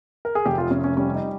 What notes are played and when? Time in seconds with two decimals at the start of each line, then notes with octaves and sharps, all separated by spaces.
0.25 A#4
0.35 G#4
0.45 F1 G4
0.58 F4
0.71 F1 C#4
0.84 C#4
0.97 G3 C#4
1.14 D#4